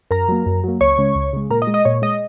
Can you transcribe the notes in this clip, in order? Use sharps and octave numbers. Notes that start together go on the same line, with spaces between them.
F#2 A#4 A#5
F#3 A#3
F#2
F#3 A#3
C#2 C#5 C#6
C#3 G#3
C#2
C#3 G#3
A#2 A#4 A#5
D#5
G#3
D#5
A#2 C#5
G#3 D#5